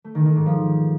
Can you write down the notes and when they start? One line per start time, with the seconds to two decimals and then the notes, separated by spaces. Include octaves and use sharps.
0.04 A3
0.15 D#3
0.25 D#3
0.36 G#2
0.46 F3